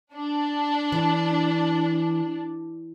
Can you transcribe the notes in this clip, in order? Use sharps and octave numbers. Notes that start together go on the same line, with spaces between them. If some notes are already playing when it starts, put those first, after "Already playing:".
D4
E3